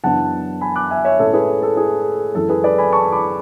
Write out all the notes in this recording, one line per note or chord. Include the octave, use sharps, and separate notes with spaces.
F#2 C#3 E3 B3 D4 F#5 A5
G#5 B5
D6 F#6
E5 G#5
C#5 E5
A2 G#3 C#4 A4 C#5
G#4 B4
A4
A4
G#4
F#2 E3 G#3 C#4 A4
G#4 B4
B4 D5
G#5 B5
A5 C#6
B5 D6